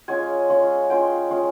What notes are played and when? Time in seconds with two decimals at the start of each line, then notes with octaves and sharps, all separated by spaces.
0.08 G#3 C#4 F4 G#5
0.49 G#3 C#4 F4
0.90 G#3 C#4 F4 G5
1.30 G#3 C#4 F4